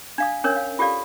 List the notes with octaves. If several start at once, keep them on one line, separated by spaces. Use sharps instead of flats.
D4 F5 D#6
C#4 D4 A#4 C#5 D#6
F5
F4 G4 A4 D5 F5